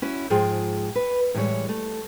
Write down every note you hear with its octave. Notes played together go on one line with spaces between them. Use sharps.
C#4 E4 F#4
G#2 F3 F4 G#4 G5
B4
A2 E3 G3 G#3 C#5
A3